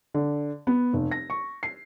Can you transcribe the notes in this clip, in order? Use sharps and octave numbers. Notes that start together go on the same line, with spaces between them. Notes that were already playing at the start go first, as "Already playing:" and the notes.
D3
B3
F1
A#6
C#6
C7